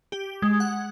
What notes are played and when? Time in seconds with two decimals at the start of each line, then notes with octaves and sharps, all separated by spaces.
0.12 G4
0.42 G#3
0.60 F#5